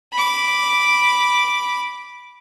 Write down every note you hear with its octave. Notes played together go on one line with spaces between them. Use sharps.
B5 D6